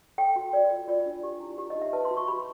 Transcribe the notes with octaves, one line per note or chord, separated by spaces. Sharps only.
A4 G5
F#4
A4 D5
F4
F4 D5
D4
G4
E4
G4
D#5
D#4
E5
B4 A5
C6
F#4
C#6
G4 B5